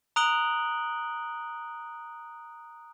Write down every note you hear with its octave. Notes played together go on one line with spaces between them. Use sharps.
A#5 D#6 F#6 D7 F#7 G7